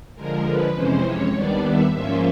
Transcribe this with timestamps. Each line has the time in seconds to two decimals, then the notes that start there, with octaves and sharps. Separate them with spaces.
0.15 D3 F3 G#3 A#4
0.46 B4
0.74 F2 C3 E3 G#3 C#4 C5
1.04 C#5
1.32 D#2 D#3 G3 B3 D4 D5
1.63 E5
1.92 G#2 F3 A#3 C#4 F4 E5